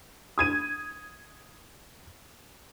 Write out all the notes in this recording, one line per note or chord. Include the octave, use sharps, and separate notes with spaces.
D#6 G#6 D#7